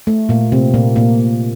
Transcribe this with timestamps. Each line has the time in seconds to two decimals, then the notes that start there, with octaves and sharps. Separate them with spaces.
0.07 A3
0.29 A#2 A#3
0.52 C3 C4
0.74 A#2 A#3
0.96 A#2 A#3